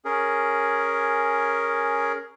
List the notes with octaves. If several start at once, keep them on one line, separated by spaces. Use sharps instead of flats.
C#4 G#4 A#4